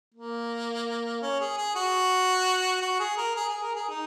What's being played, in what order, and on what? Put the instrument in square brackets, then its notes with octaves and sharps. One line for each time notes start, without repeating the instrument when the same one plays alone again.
[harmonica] A#3
C#4
G#4
G#4
F#4
F#4
G#4
A#4
G#4
G#4
A#4
G#4
D#4